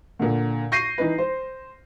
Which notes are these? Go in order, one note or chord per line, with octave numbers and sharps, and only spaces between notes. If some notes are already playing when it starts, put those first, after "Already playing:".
A#2 D3
C#6 G6 A#6 C7 D#7
E3 D#4 B4
C5